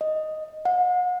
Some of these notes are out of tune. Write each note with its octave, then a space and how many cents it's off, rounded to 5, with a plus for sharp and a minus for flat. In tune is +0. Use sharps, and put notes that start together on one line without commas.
D#5 +0
F#5 -40